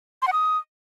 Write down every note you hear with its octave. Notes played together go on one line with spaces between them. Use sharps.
C6
F#5
D#6